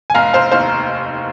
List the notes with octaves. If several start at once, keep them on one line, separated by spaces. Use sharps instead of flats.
G#5
F1 F5 A#5
F1 C5 F5
D#2 C5 F5